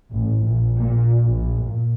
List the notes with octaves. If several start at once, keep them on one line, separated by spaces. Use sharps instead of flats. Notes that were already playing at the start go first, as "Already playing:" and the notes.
A1
A#1
A#2
A#1
A#2